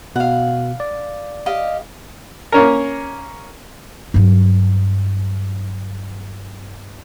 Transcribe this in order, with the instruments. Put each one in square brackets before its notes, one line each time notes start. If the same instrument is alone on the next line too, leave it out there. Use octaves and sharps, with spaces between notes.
[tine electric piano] B2 [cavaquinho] F5 F#5
[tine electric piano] D5
[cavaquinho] G4 D#5 F5
[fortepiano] A#3 C#4 A#4
[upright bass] G2 F#3